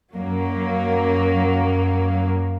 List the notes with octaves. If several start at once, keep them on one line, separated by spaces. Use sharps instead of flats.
F#2 F#3 A#3